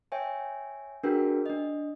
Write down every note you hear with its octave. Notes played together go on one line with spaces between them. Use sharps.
C#5 E5 G5 G#5
D4 F#4 G#4 A#4 B4 G5
D4 D#5